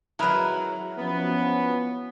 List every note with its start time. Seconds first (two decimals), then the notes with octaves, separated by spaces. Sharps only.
0.19 F#3 G#3 E4 A#4 B4
0.98 F3 B3 C#4